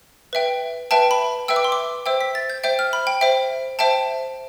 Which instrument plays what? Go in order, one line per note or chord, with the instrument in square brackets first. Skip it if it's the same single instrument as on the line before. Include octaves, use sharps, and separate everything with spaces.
[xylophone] B4 E5 G5
B4 E5 G5 A5
B5
B4 E5 G5 E6
D6
C6
D6
C5 E5 G5 E6
B6
A6
G6
C5 E5 G5 G6
F6
B5
G5
C5 E5 G5
C5 E5 G5 A5